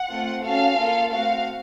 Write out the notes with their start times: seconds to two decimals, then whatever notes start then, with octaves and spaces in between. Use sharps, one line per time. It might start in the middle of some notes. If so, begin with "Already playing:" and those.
Already playing: F#5
0.09 A3 C4 F4
0.42 C#4 F#4 A4 F5
0.77 A#3 F4 A4
1.11 A3 C4 F#4 F5